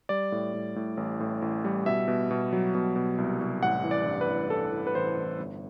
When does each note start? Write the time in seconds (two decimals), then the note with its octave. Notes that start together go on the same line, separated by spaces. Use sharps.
0.09 G3 D5
0.32 A2
0.54 A2
0.76 A2
0.97 A1
1.20 A2
1.42 A1
1.64 G3
1.86 B2 E5
2.08 B2
2.31 B2
2.53 F#3
2.75 B2
2.96 B2
3.18 C2
3.41 C2
3.62 A1 F#5
3.84 E3
3.91 D5
4.06 G2
4.21 B4
4.29 A1
4.50 G2 A4
4.72 E3
4.87 B4
4.95 A1 C5
5.16 A1
5.39 G1